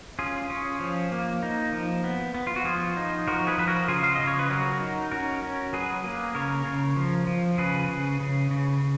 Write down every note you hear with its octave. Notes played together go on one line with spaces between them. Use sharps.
C#4 F4 G#4
C#4
F3
A#3
D#4
F3
B3
B3
F4
F#4
F3 F4 G#4
D#4
F3 F#4 A#4
G#4 B4
F3 B4
F#4 A#4
C#3 F4 G#4
F5
C#3 D#5
C#5
B4
F#3 F#4 A#4
D#4
C#4 F#4 A#4
C#4
F#3 G#4 B4
A#3
C#3 A#4 C#5
C#3
F3
F3
C#3 G#4 B4
C#3
C#3
C#3